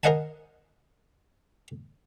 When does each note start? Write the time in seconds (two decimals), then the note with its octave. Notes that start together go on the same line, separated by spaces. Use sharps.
0.03 A#4 C5 D#5 F#5 G#5 A5